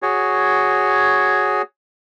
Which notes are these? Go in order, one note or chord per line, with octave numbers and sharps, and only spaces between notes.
F#4 G#4 C#5